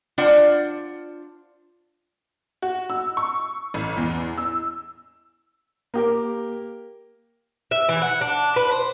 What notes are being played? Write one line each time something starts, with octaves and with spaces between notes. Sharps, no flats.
D4 F4 C5 D5 F#5
F#4
E6
C#6
A1
E2
E6
A#3 G4 A#4
E5
E3
F#5
D4
B4
C5